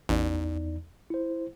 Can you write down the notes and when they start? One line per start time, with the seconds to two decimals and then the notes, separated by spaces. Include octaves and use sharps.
0.09 A1 E2 D#4 D5
1.10 E4 C5